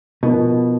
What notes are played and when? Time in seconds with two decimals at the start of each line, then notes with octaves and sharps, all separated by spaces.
0.23 B2 F3 B3 D#4 A#4